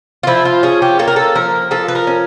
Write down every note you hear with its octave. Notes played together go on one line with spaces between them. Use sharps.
F4
F3 E4
F4
C#4 G#4
G4
A#3 A4
A#4
A4
F3 A#4
F3 A4
B4
A#4
C#4